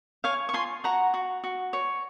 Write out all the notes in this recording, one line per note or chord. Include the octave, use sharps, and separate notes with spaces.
C#5 F5 G#5
C#6
F4 G#5 C6
F#4 F#5 A#5
F#4
F#4
C#5